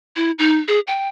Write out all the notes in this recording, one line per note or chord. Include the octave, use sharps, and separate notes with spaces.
E4
D#4
G#4
G5